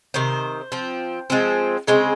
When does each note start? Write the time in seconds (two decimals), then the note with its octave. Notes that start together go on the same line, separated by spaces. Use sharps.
0.14 C3 D#3 C5
0.72 F3 C4
1.30 F3 G#3 C4
1.87 C#3 G#3 C4